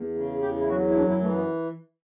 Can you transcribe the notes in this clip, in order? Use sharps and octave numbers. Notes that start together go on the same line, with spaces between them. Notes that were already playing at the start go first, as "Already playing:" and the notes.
Already playing: E2
C#3
E2 G4
E4
F#3 F#4
E4
F#2 D4
E4
E3 A3
B3